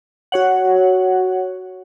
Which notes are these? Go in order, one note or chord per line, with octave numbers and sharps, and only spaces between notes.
F#4 C#5 F#5